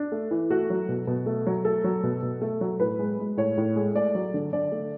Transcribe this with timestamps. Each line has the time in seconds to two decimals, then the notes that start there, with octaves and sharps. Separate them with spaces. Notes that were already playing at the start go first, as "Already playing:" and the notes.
Already playing: D4
0.12 A3
0.31 E3
0.50 A3 F#4
0.70 F#3
0.89 B2
1.07 B2
1.26 A3
1.47 F#3
1.65 A3 A4
1.84 F#3
2.04 B2
2.23 B2
2.42 A3
2.61 F#3
2.80 A2 B4
2.99 G#3
3.19 G#3
3.37 A2 C#5
3.58 A2
3.76 G#3
3.95 A3 D5
4.15 F#3
4.34 D3
4.53 D3 D5
4.72 A3